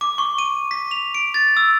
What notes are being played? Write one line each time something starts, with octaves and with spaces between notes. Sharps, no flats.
D6
C#6
D#7
B6
F7
D7
A6
E6